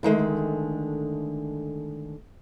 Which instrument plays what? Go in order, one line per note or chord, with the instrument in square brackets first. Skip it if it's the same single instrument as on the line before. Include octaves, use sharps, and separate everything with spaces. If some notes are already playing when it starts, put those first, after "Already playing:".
[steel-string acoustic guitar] D3 D#3 G#3 A3